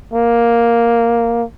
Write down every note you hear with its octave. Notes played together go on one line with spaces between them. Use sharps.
A#3